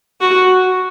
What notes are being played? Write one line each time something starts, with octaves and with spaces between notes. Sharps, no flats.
F#4